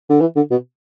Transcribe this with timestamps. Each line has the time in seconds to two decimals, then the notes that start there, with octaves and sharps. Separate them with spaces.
0.10 D3
0.21 E3
0.36 D3
0.51 B2